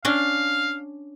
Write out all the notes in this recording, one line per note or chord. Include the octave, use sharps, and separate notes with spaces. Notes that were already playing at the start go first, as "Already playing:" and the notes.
C#4 D4 F5